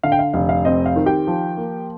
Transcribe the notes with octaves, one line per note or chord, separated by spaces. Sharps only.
D3 F5
G5
F5
F1 F5
F5
C4 D#5
F5
D#3
G4 G5
F3
A#3